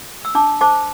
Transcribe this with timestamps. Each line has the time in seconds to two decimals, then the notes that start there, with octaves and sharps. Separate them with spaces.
0.25 E6
0.35 D4 A5 D6
0.61 C5 A5 D6